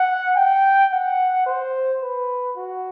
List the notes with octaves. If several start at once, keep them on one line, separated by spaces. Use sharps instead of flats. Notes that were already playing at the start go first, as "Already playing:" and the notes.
Already playing: F#5
G5
F#5
C5
B4
F#4